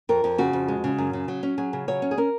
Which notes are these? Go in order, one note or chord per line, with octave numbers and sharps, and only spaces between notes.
F2 A#4
F2
C#3 F#4
F2
G#3
C#3
F#2
C#3
F#3
C#4
F#3 G#4
C#3
F#3 C#5
C#4
G#4
C#4 A#4